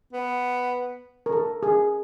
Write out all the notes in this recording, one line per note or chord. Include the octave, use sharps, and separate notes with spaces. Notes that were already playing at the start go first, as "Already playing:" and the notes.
B3
A#4
A4
G#4